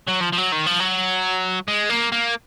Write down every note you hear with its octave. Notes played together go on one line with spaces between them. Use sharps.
F#3
F3
F3
F#3
D#3
F3
F#3
G#3
A#3
A#3